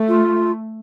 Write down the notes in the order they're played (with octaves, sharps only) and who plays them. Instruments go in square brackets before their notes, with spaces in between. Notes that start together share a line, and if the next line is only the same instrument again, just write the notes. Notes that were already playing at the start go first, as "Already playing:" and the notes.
Already playing: [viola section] A3
[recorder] F4